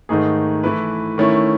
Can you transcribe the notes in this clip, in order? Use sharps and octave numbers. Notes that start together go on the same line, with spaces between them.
G#2 D#3 A3 D#4 G#4
E3 A3 E4 B4
D#3 A3 C#4 E4